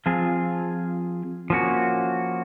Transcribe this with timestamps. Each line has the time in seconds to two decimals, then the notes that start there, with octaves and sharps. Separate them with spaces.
0.06 F3 C4 F4 G#4
1.50 F3 A#3 C#4 F#4